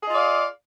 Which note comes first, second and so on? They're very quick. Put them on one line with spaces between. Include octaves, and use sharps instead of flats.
G#4 D#5 F4 D5 F5